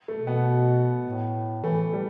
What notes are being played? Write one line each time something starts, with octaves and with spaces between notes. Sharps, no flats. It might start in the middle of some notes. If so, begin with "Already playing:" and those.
A3
B2
B3
A2
E3 A3
G3